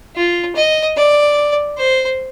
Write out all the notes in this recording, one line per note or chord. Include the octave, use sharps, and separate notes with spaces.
F4
D#5
D5
C5